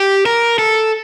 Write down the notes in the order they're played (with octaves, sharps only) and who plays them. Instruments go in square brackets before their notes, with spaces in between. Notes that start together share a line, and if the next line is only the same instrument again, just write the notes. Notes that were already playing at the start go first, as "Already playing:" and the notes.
Already playing: [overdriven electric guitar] G4
A#4
A4